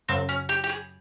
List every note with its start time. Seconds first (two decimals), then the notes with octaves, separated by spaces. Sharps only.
0.09 F#2 C#3 F#3 C4
0.29 C#4
0.49 G4
0.64 G4
0.69 G#4